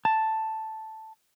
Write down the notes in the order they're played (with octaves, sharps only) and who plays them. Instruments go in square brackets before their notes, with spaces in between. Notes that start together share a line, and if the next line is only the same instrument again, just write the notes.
[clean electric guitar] A5